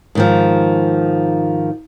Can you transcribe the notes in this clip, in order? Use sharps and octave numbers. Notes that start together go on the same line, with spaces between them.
G#2 D#3 F3